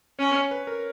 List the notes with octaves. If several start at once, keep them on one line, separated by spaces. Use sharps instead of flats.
C#4 C#5
C#5
B4
A#4